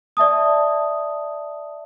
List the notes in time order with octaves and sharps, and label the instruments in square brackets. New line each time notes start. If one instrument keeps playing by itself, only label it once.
[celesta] D5 E5 A5 D#6